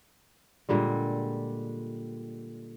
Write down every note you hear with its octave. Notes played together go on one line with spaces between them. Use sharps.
A#2 D3 G3 G#3